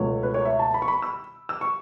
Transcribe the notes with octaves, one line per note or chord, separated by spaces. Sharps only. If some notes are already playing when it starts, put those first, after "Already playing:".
Already playing: C#2 B2 F#3 A3 C#5
B4
C#5
E5
A5
B5
C#6
B5
E6
E6
C#6